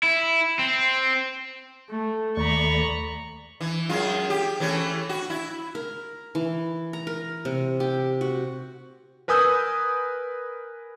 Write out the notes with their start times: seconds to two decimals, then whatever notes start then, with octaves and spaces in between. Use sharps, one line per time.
0.03 E4
0.59 C4
1.89 A3
2.37 D#2 A3 D5 A#5 B5 C#6
3.61 E3
3.89 F#2 G#3 F4
4.30 G4
4.60 E3 A3 C#4
5.09 F#4
5.30 E4
5.75 A#4
6.35 E3
6.93 A#5
7.07 A#4
7.45 C3
7.80 G4
8.21 F#4
9.28 A#4 B4 G#5 D#6 E6 G6